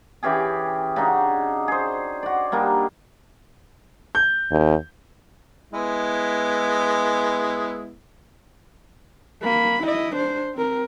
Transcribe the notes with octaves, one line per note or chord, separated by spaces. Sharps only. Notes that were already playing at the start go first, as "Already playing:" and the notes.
E3 C#4 G4 G#4
C#3 D4 D#4 F#4
G#4 C5
F#4 D5
G3 A#3 D4 D#4
G6
D#2
G#3 B3 E4
A#3 B5
E4 D#5
D4 C5
C4 A#4